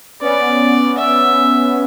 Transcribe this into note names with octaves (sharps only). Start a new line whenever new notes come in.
B3 C#4 D5
E5